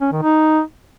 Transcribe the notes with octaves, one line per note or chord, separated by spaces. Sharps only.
C#4
D#3
D#4